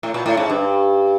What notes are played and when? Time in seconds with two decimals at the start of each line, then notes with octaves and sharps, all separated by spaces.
0.03 A2
0.14 A#2
0.26 A2
0.37 G#2
0.50 G2